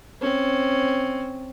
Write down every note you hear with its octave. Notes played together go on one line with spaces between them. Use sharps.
C4 C#4